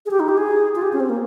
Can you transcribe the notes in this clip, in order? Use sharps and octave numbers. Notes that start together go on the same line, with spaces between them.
G#4
G4
D#4
G4
G#4
F4
G4
C#4
C4
A#3